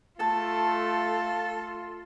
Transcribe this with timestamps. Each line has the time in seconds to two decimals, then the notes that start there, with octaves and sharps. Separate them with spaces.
0.20 A3 F4 A4 A5